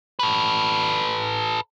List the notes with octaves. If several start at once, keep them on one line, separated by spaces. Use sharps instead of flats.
A4 B4